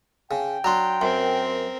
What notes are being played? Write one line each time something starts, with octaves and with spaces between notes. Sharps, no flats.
C#3 G5
F#3 D4 A#5 C6
F#2 C4 A#4 C6